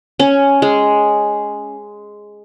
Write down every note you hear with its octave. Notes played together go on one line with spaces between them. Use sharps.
C#4
G#3